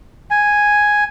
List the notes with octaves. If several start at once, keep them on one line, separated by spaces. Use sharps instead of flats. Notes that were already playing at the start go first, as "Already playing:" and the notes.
G#5